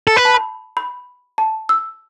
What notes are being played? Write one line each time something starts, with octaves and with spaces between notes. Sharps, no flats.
A4
B4 B5
A5
B5
B5
A5
E6